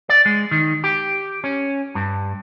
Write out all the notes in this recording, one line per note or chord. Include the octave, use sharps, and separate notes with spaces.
D5
G#3
D#3
G4
C#4
G2